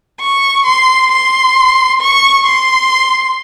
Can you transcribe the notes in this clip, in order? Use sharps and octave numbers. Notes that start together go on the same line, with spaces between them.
C#6
C6
C6
C#6
C6